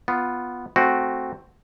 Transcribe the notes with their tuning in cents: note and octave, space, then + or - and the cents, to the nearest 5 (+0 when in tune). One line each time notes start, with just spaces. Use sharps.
B3 +0 F4 +0
A3 +0 C4 +0 F#4 +0